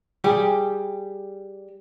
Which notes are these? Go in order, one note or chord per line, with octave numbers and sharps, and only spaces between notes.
G3 G4 G#4 G5